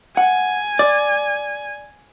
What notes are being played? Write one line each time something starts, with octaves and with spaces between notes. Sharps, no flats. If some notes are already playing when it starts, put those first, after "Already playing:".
F#5 G#5
D5